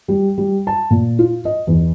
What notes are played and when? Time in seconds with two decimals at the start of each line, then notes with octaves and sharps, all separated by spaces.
0.08 G3
0.38 G3
0.67 A5
0.90 A#2
1.19 F4
1.45 D#5
1.67 E2